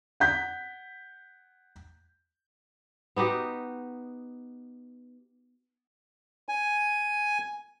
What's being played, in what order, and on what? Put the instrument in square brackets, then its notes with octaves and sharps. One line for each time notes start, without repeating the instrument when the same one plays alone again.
[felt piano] F#5 G6 B6
[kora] B3 D#4 F#4 G4
[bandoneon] G#5